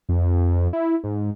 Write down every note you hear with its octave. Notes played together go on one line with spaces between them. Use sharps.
F2
E4
G#2